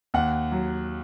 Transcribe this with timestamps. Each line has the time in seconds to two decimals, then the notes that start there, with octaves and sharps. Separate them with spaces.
0.14 D#2 F#5
0.52 F#3